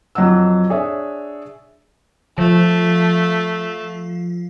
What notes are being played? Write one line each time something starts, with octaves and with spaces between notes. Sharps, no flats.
F2 F#3 D#5 F#5 E6
D4 G#4 C#5 E5
F3 A3